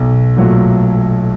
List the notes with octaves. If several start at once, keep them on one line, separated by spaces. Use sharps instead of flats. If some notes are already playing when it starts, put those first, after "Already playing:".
Already playing: B1
A#2 F#3 A3